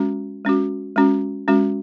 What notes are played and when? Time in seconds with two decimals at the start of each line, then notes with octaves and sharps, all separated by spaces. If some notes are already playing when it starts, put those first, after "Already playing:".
Already playing: G#3 C#4 F#4
0.45 G#3 C#4 F#4
0.96 G#3 C#4 F#4
1.48 G#3 C#4 F#4